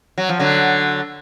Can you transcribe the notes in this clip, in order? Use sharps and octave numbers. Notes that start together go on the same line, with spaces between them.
F#3
F3
D3 F#3